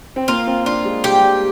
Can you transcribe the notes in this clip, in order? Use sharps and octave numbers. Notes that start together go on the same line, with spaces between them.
C4
A#3 F4
C4
D4 F4
G#3
G3 G4
G3